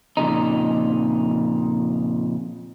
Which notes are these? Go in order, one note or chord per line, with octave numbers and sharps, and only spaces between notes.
F2 A#2 C#3 D#4